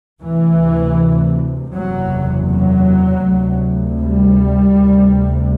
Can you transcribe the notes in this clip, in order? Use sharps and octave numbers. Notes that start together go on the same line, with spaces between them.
D2 C3 E3
F#1 E2 C3 F#3
F#3
D2 C3
G3
D2 C3